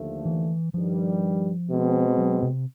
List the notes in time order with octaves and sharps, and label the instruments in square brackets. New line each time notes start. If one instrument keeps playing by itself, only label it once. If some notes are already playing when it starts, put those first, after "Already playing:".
Already playing: [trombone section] D#2 D3 F3 A3
[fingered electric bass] E3
[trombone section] G2 D#3 G3 [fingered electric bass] F3
[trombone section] B2 G#3 C4
[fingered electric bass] F#3
C3